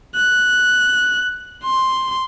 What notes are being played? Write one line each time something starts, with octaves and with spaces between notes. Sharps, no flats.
F#6
C6